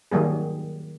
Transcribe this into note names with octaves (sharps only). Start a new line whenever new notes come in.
D#3 F#3 G3 A#3 G#4